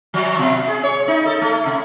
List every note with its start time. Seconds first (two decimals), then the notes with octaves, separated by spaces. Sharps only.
0.14 F3
0.39 B2
0.68 G#4
0.83 C#5
1.08 D#4
1.25 A4
1.41 A3
1.66 C3